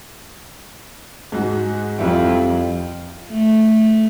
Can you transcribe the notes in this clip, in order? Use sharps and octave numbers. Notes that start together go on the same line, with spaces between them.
G#2 D#4 F#4
F2 G3 E4
A3